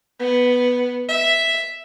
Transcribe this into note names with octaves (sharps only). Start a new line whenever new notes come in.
B3
E5